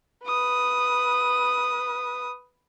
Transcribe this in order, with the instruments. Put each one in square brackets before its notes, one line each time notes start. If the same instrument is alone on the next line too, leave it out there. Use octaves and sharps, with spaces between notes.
[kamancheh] B4 D#6